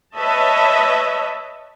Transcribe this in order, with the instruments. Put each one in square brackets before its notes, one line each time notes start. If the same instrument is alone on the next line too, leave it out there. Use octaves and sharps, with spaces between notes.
[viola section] B4 C#5 D#5 E5 A5